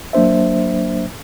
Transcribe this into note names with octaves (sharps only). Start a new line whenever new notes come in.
F#3 A#3 D4 C5 E5